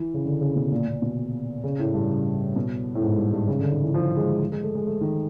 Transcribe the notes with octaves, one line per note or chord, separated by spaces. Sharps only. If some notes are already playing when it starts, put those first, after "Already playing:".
Already playing: E3
C#3
D3
C#3
B2
A#2
A#2
B2
C#3
A2
G2
C#3
B2
A2
G#2
G2
G2
C#3
D3
D#3
E3
F3
G#3
G#3
A3
G#3
A3
D#3